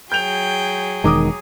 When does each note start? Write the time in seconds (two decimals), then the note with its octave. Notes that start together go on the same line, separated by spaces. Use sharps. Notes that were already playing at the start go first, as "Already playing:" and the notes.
0.12 F#3 G#4 G5 G6 F7
1.04 E1 D#3 G#3 A#5 D6 D#6